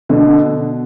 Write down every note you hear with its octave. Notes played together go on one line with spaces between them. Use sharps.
B2 D3